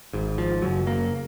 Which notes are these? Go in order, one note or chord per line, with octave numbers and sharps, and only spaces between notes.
G#1 G#2
F3
F#1 F#2 C#3 F#3
A#3